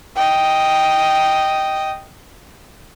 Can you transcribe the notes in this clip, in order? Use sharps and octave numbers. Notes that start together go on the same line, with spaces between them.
D#5 G5